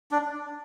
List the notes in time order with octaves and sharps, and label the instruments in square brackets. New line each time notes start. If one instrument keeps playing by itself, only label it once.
[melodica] D4